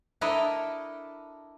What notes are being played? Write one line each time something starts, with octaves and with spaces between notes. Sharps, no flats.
D4 E4 A4 A#4 D#5